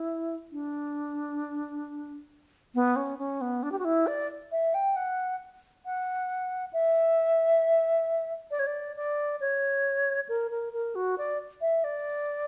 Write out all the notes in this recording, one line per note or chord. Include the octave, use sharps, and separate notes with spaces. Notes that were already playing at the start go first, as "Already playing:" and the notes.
Already playing: E4
D4
B3
C#4
C#4
B3
D4
G4
F#4
E4
D5
E5
G5
F#5
F#5
E5
D5
C#5
D5
D5
C#5
A#4
A#4
A#4
F#4
D5
E5
D5